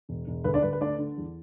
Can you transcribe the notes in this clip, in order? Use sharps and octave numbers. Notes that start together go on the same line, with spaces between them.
E1
E1
D2 B4
D4 D5
D2 B4
B4
A3 D4 D5
D3
E2